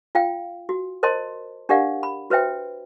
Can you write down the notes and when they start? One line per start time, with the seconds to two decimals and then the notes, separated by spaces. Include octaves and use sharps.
0.15 F4 F5 G5
0.69 F#4
1.03 A#4 C5 D#5 A5 C6
1.69 D4 G4 A#4 D5 F5 F#5
2.03 B5
2.30 F#4 B4 C5 E5 G5